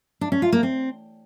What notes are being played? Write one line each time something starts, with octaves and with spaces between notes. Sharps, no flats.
D4
C#4
F4
A#3
C4